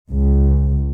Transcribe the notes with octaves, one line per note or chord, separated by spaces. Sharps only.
C#2